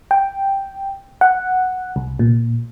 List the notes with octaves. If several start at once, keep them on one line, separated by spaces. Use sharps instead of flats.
G5
F#5
C2
A#2